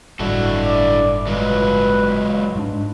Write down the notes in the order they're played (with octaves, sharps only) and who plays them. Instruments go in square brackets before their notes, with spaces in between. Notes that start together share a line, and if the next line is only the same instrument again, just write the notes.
[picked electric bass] G1 A2 G3 [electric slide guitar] D4 E4 A4 [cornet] F#4
[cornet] D5
[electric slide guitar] F#3 G#3 F4 [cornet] B4
[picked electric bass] G#2 G#3 D4